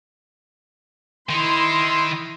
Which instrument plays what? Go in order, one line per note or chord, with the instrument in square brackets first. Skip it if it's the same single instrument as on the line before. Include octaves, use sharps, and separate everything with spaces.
[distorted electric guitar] D#3 D#4 [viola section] E4 C6